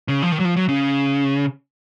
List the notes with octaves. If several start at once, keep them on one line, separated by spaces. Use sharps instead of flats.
C#3
F3
D#3
F#3
F3
F#3
C#3